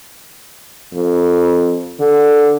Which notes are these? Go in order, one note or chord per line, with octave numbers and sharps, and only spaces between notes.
F2
D3